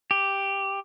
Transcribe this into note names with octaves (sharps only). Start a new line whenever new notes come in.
G4